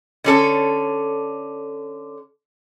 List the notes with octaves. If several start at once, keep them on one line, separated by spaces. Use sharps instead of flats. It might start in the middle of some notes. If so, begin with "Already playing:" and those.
D3 C#4 A4